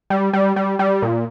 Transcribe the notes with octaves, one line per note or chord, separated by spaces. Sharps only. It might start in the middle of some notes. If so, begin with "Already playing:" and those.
G3
G3
G3
G3
A#2